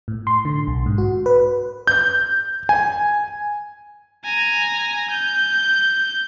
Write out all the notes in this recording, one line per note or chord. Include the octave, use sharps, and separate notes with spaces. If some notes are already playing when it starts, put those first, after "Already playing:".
A2
C6
D3
B1
G#2
F#4
B4
G6
G#5
G#5 A#5
G6